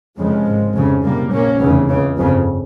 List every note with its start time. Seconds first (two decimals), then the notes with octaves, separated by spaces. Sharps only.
0.17 F1 F2 C#3 F3 G#3
0.46 G#1 G#2
0.74 F1 F2 C#3
1.03 C2 A#2 G3 A#3
1.32 A#1 A#2 A#3 C#4
1.61 F1 E2 C#3 E3
1.89 C#2 C#3
2.17 G1 F2 C#3